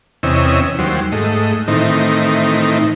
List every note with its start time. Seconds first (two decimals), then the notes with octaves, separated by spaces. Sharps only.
0.23 E2 C3 C#4 D#5 E6
0.79 D#2 F#3 G3 C5
1.12 G#2 A3 D#5
1.68 A2 D#3 E3 C4 D#4